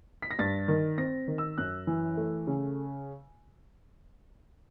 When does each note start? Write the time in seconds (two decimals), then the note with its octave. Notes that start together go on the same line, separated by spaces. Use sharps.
0.22 B6
0.31 A#6
0.39 G2 A6
0.68 D#3
0.98 C4 A#6
1.28 D#3
1.38 E6
1.58 F#2 F#6
1.87 E3
2.17 A3
2.47 C#3